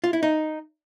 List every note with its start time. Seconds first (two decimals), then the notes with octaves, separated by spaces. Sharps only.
0.04 F4
0.13 E4
0.23 D#4